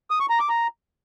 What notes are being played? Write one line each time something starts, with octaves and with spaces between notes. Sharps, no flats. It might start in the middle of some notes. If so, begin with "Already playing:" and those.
D#6
C#6
A#5
D6
A#5